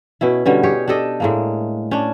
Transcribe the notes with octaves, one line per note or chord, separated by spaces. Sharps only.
B2 C#4 E4
B2 D3 G3 C#4
G4 G#4 C#5
D4 G4 A4 D#5
A2 G#3 A#3
C#4 D4